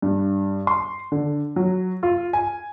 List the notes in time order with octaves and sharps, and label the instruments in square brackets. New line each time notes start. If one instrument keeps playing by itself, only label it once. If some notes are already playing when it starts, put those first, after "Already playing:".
[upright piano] G2
C6
D3
F#3
F4
G#5